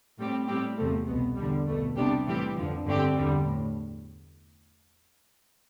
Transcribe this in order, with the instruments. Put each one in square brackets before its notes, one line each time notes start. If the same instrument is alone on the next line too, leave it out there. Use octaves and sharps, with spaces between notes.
[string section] A2 G3 C4 G4
A2 G3 C4 G4
E2 C3 F3 A3
C2 B2 B3
E2 D3 G3
C2 B2 A3
C3 G3 B3 D4 G4
A2 E3 G3 C4 G4
F2 D3 F3
G2 D3 A3 C4 G4
E2 D3 G3
A2